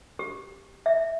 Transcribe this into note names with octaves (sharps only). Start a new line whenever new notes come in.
G4
E5